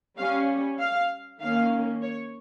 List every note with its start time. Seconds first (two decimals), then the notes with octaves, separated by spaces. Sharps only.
0.18 G3 C#4 F5
0.79 F5
1.41 D#3 A#3 C#4 F5
2.02 C#5